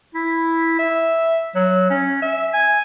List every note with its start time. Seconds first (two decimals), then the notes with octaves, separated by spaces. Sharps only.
0.15 E4
0.79 E5
1.55 F#3
1.90 C#4
2.22 E5
2.53 G#5